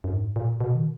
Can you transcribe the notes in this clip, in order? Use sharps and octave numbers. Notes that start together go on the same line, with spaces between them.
F#2
G#2
A#2
B2
D#3